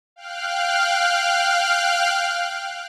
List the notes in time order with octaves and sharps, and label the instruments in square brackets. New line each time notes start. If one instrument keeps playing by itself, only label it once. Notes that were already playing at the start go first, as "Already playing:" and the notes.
[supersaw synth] F5 G5 F6 F#6